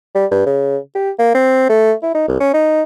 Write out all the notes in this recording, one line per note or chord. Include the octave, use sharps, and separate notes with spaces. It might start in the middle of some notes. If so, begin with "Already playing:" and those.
G3
G2
C#3
G4
A#3
C4
A3
E4
D#4
C2
C#4
D#4